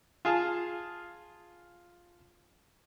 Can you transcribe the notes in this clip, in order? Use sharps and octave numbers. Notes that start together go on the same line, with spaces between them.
F4 G#4 F5 A5